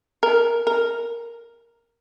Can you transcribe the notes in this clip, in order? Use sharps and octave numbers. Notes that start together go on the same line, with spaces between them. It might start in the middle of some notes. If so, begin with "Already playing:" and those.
A#4
A#4